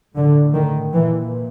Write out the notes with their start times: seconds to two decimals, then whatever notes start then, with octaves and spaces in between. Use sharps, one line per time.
0.17 A2 D3
0.55 D#3
0.94 A#2 E3